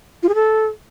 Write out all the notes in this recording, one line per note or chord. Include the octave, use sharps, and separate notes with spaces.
F4
G#4
A4